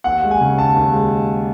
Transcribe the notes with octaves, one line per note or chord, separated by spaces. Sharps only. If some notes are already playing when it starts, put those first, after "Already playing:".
D#2 F#5
G#3
G#5
C#3
D#2 A5
D#2
G#3